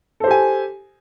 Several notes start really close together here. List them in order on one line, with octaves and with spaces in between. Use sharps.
A4 C5 G4 G#5